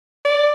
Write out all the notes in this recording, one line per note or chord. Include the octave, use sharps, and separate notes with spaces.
D5